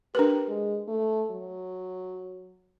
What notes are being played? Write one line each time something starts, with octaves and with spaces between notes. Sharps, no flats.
D4 G4 A#4 B4
G#3
A3
F#3